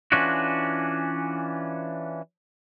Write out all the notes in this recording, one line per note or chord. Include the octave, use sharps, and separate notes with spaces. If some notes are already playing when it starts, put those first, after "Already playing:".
E3 C#4 D4 F4 F#4